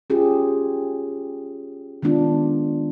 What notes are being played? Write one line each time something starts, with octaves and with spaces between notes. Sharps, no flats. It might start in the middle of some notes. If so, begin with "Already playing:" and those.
C#4 F4 G4 G#4
D#3 G#3 B3 D4 F4